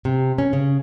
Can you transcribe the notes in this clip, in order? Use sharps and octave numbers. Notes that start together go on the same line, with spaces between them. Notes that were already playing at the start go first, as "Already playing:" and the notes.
C3
C#4
C#3